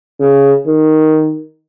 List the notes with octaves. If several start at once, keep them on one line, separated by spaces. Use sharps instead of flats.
C#3
D#3